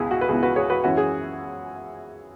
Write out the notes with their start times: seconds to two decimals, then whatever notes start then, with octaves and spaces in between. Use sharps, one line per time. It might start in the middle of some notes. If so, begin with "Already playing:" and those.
Already playing: C#2 B2 E4 G#4
0.11 F#4
0.21 B4
0.29 C#2 B2 B3 E4 G#4
0.43 F#4 B4
0.56 G#4 C#5
0.70 F#4 B4
0.84 F#2 E3 C#4 E4 F#4
0.97 G#4